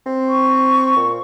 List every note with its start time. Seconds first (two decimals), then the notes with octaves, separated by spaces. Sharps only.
0.06 C4
0.28 C#6
0.96 A#2